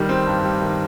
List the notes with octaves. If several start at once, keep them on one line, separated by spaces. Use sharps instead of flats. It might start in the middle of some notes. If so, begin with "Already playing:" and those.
Already playing: D#3 G3
C4
G2
G3
D#3